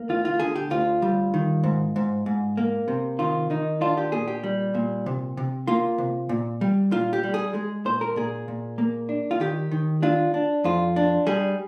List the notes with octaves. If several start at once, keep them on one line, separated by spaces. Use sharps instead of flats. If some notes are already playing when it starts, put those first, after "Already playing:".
Already playing: A#3
D2 F4
F4
D3 G#4
G4
D2 F4
G3
D#3
G#2
G#2
G#2
A#3
C3
D#3 F4
D#3 D#4
D4 F4
G4
A#2 G#4
G4
G3
A#2
C3
C3
A#3 F4
C3
A#2
G3
A#2 F4
G4
G3
G#4
G#3 G#4
A#2 C5
A#4
A#2 G#4
A#2
A#3
D4
F4
D#3 G4
D#3
D4 F4
D4
F2 F4
D4
G3 G#4